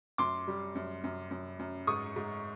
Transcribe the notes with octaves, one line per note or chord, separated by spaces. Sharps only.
F#2 C6 D6
G3
F#2
F#2
F#2
F#2
G#2 C#6 D#6
G#2